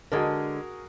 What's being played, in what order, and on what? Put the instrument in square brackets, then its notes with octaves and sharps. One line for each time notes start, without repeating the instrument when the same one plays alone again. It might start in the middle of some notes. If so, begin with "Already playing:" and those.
[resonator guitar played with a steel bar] D3 G#3 [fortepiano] F#4 G#4 A#4